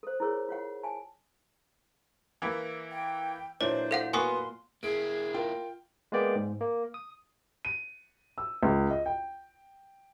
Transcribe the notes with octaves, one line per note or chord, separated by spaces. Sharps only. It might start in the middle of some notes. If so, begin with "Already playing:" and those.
A4 C5
E4 F4 G#4 A#4 C#5
F4 C#5 F#5
G#5 A5
E3 A#3 E4
G5
A#2 E3 F#3 D4 C5 C#5
A4 F5 F#5
A#3 B3 F#4 A#4 G#5 C6 C#6 D#6
A#3 E4 G#4 D7
F4 A#4 G5
G#3 A#3 B3 D5 G5
G#2
A#3
D#6
D#7
E6
C#2
D#5
G5